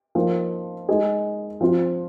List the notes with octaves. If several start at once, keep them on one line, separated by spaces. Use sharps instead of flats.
F3 A#3 D#4
G#3 D#4 G#4
F3 C4 F4